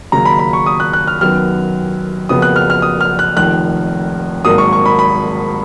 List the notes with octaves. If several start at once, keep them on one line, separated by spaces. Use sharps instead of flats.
D#2 C#3 F#3 A#5
B5
B5
C#6
D#6
F#6
F#6
F6
F#2 D#3 F#3 B3 F6
F#1 F2 C#3 F#3 B3 D#6
F#6
F6
F6
D#6
F6
F#6
F1 F2 D#3 F#6
G#1 G#2 F#3 A#3 D#6
C#6
C#6
B5
B5